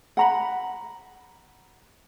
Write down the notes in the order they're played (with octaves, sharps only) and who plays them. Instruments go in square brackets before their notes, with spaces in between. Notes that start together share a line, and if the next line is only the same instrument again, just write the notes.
[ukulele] F#5 A#5 B5